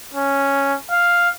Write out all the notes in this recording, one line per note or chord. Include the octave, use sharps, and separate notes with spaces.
C#4
F5